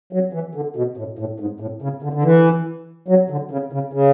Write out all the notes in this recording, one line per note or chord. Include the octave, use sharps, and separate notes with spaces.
F#3
E3
D3
B2
A2
A2
G#2
A2
C#3
D3
D3
E3
F#3
D3
C#3
C#3
C#3